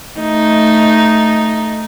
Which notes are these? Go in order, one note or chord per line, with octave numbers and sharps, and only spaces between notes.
A3 D#4